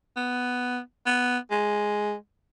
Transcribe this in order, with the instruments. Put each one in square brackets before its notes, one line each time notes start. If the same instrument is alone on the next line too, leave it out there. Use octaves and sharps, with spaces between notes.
[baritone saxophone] B3
B3
G#3